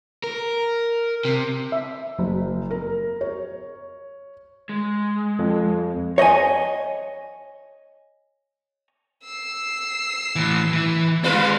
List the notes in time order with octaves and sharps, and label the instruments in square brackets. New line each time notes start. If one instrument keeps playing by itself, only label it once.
[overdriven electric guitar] A#4
C3
[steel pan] E5
[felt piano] F#1
A#4
C#5
[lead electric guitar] G#3
[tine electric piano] F2
[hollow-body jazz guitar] C#5 D#5 G5 G#5
[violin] E6 C7
[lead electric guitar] A2 E3
E3
[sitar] G3 F4 B4 [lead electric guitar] G#3 C4 [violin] F5